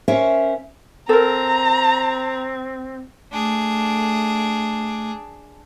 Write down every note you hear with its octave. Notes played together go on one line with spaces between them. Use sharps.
C#4 A#4 C5 C#5 E5
C4 A4 A#4 A#5
A3 D4 G#4